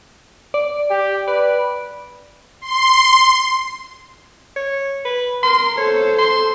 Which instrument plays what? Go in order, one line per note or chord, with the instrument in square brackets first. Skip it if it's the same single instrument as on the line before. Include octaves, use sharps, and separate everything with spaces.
[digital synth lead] D5
[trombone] G4
[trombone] B4 [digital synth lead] D5
[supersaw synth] C6
[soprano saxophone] C#5
B4
[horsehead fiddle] A#4 [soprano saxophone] C6
[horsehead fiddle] A4 C5 [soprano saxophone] C#5
[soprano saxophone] C6